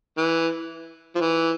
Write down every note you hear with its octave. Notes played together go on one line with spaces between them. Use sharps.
E3
F3
E3